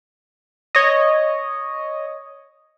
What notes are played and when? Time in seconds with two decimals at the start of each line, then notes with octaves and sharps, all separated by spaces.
0.75 C#5 D#5